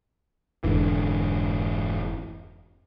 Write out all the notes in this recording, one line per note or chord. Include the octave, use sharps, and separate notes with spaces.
F1 G#2 D3 E3